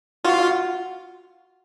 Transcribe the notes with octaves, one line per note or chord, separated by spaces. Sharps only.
F4 F#4